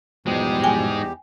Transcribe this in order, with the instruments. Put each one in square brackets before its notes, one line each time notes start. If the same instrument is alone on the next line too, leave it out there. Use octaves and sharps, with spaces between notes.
[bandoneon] E2 G4 [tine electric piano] B2 F3 G3 [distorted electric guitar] G#3 D#4
[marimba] G5 G#5